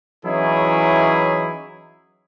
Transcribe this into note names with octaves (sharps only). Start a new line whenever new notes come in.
E3 F#3 C#4 D#4 E4 G#4